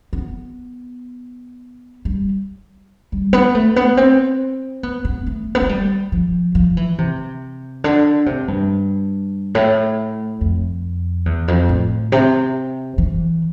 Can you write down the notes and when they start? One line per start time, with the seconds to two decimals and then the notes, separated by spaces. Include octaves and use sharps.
0.13 B3
2.05 G3
3.12 G3
3.33 B3
3.55 A3
3.76 B3
3.97 C4
4.83 B3
5.05 B3
5.26 A3
5.55 B3
5.62 A3
5.69 G3
6.12 F3
6.55 F3
6.77 E3
6.98 C3
7.84 D3
8.26 C3
8.48 G2
9.55 A2
10.41 F2
11.26 E2
11.48 F2
11.69 A2
12.12 C3
12.98 E3